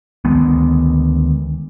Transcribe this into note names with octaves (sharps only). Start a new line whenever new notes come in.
D2 D#3 G#3 B3